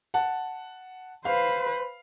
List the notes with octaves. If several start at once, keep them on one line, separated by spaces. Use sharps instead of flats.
F#5 A5
B4 C5 F5